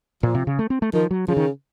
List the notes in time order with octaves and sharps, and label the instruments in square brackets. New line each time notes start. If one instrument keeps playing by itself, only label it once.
[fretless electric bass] A#2 [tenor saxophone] F3
[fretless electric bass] C3
C#3
A3
C4
A3
[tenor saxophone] D#3 [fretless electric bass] F3
[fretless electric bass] F#3
[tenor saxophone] C#3 [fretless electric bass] F3
[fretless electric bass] D#3